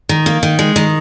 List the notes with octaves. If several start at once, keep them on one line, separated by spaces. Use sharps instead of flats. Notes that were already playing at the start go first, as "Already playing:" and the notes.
D#3
A#3
D#3
G#3
D#3